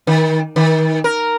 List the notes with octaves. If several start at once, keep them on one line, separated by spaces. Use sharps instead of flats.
D#3
D#3
A#4